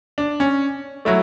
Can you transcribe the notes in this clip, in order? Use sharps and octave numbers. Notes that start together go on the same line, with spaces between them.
D4
C#4
F#3 A3 E4